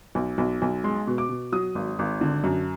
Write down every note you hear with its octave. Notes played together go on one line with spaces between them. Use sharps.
B1
B1
B1
G#3 C6
B2
D6
B2
F#3 D#6
G#1
G#1
D3
F#2